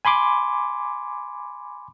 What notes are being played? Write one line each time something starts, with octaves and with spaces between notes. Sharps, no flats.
G#5 B5 C6 D6